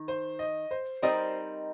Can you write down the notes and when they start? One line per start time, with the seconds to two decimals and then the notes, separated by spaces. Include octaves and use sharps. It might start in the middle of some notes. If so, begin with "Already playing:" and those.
Already playing: D#3
0.08 C5
0.39 D#5
0.71 C5
1.02 G3 C4 D#4 A#4 C5 D#5